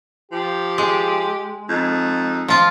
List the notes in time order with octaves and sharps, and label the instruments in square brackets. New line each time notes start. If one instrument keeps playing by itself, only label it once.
[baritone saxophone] F3 [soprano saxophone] G4
[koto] G#3
[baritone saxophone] F2 [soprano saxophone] D#4
[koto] F3 F4